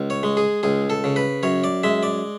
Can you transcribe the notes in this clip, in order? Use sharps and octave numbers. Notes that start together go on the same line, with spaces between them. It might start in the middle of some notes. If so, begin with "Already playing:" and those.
Already playing: C#2
C#5
G#3
G#4
C#2 G#4
A4
C#3
B4
F#2 C#5
D5
G#3 E5
D5